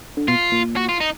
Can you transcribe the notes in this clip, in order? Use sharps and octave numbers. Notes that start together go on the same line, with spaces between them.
D3
B2 F4
A#2
F#4
F4
D#4